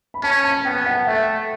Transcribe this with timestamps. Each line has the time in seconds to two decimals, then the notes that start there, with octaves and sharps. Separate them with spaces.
0.14 B5
0.23 C#4 A5
0.44 A5
0.65 B3 G5
0.86 F#5
1.07 A3 E5